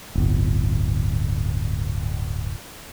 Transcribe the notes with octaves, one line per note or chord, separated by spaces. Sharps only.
D1 G1